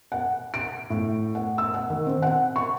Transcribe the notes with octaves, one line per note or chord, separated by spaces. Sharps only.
F#5
D7
A2
F#5
E6
F#5
D#3
C4
F#5
C#6